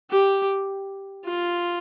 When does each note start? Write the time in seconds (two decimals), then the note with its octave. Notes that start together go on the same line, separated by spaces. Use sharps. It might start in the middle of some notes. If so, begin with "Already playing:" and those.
0.11 G4
1.25 F4